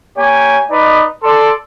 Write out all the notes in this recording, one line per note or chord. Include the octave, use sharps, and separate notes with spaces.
A#3 G4 C#5 G#5
D#4 B4 D5 D#5
A4 D5 C6